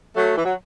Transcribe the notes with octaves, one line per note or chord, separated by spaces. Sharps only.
F#3 A3
E3
F#3